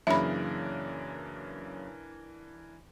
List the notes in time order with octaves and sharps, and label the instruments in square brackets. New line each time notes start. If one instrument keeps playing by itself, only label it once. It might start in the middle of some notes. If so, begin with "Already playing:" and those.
[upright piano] F#2 C#3 A#3 [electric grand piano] E3 D4 A#4 [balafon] E5 B5